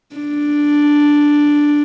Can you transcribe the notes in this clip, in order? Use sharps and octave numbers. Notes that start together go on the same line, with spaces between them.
D4